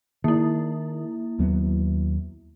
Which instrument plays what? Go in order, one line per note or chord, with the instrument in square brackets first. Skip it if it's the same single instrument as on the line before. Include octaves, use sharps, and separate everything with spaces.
[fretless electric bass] D#3 [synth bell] A#3 E4
[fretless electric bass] D#2 F#3 B3